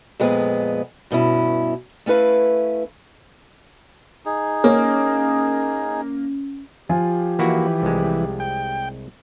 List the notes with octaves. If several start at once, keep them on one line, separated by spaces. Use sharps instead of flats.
F2 A#2 G#3 B3
G2 B2 C#4 E4
A3 C#4 E4 B4 F5
D#4 G#4
A#3 C#4
F3 F4 G4 G#5
E3 A#3 E4 F#4
C2 G#3
G5